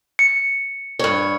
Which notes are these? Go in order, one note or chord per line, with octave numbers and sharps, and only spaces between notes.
C#7
G2 C#5